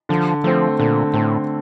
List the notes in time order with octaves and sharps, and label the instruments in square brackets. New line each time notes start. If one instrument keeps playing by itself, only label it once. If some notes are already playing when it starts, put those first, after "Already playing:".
[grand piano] D3 [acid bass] F3
[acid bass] F3 [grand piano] A3 C4
[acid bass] A#2 [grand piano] D3
[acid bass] A2 [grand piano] A3 C4